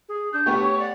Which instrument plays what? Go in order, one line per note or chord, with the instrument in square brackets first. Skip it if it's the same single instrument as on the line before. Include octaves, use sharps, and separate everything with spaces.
[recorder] G#4
[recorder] D4 [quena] G6
[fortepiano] A3 B3 G4 [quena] C#6
[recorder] C#5
[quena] D5 [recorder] F#5